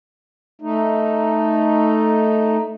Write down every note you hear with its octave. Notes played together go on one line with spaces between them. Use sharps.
A3 D#4